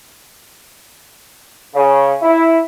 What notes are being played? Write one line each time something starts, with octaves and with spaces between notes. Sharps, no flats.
C#3
E4